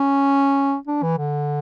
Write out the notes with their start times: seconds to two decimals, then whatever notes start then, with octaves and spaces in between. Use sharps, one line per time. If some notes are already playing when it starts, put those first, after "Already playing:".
Already playing: C#4
0.87 D4
1.02 E3
1.18 D3